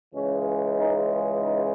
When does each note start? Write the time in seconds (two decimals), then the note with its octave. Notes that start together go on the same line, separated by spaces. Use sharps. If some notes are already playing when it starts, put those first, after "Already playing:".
0.14 C#2 C#3 E3 G#3 C#4
0.78 D#4
1.41 D#4